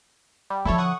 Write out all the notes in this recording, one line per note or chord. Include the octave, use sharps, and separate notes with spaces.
G3
D3 F3 E4 A4 C#5
F#5 C#6 D#6